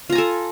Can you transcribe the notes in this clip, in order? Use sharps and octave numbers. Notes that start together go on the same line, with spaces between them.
F4 A4 G#5 A#5